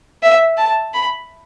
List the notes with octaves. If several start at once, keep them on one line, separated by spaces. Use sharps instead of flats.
E5
A5
B5